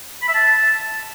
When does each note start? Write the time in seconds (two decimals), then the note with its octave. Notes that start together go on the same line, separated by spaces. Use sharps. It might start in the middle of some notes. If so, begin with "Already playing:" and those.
0.22 B5
0.28 E5
0.34 A5